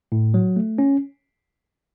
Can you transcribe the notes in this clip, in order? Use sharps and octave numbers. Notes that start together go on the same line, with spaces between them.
A2
F#3
A3
C#4